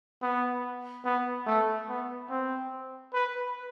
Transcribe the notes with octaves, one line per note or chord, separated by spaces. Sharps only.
B3
B3
A3
B3
C4
B4